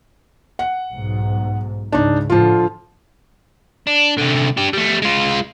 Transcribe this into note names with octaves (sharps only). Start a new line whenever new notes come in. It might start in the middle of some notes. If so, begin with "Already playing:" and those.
F#5
B1 G#2
C#2 G#2 C#3 D4 D#4
A2 D3 F3 F4
D4
C2 D3
D4 G4
G3 A3
G#3 F4